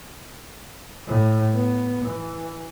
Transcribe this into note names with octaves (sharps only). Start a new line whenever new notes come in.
A2
B3
E3